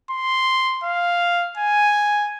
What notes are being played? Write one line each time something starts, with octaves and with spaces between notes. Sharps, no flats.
C6
F5
G#5